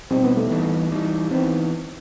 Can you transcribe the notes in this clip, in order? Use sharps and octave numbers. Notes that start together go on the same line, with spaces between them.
B2 G3 C4 D#4
B3
A3
E3 G3 B3 D#4
E3 G3 D#4
E3 B3 C4 D#4